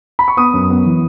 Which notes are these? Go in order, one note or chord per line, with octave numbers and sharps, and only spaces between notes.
B5
C#6
B3 D#6
F#2
B3
E3